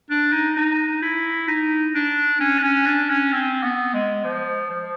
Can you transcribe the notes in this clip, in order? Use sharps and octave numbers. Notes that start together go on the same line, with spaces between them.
D4
D#4
D#4
E4
D#4
D4
C#4
D4
C#4
D4
C#4
C4
B3
G#3
F3
F3